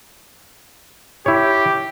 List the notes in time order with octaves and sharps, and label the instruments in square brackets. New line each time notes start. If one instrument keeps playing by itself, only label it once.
[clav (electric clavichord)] E4 C#5 [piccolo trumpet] G4